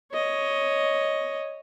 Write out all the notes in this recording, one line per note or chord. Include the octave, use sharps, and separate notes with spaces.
C#5 D#5